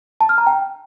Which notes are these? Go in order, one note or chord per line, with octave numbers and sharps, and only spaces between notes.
A5
F6
A#5
G5